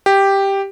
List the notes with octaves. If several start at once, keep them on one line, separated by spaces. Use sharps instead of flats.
G4